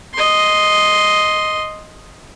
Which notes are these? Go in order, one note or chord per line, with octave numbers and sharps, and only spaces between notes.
D#5 C6